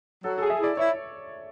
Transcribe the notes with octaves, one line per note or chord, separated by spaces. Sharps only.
F#3 A4
A4
G#4
E5
E4 D5
E4 C#5